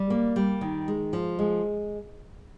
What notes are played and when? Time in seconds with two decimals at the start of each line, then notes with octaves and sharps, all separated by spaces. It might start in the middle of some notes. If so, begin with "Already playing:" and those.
Already playing: G3
0.10 A#3
0.36 G3
0.61 D#3
0.88 G#3
1.13 F3
1.39 G#3